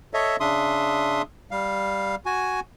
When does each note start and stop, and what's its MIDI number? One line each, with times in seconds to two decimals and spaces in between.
0.14 0.36 69
0.14 0.36 73
0.14 0.36 75
0.14 0.36 76
0.40 1.22 49
0.40 1.22 62
0.40 1.22 76
0.40 1.22 84
0.40 1.22 87
1.51 2.15 55
1.51 2.15 77
2.26 2.60 66
2.26 2.60 80